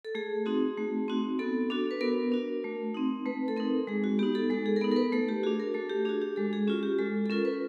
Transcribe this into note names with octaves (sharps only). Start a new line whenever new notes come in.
A4
A3 G#4
C4 D#4 F#4
A3
C4 D#4 F#4
B3 A4
D4 F#4 A4
B4
B3 A#4
D4 F#4
A3
C4 D#4
A3 B4
A4
C4 D#4 A#4
G#3 G#4
F#4
B3 D#4 G4
A4
G#3 A4
G#4
A#4
B3 D#4 A4
A#4
B4
A3 A4
G4
D4 F#4 G#4
A#4
A3 A4
G4
D4 F#4 G#4
G4
G#3 A4
G#4
C#4 F4 F#4
G4
G#3 A4
A4
C#4 F4 A#4
B4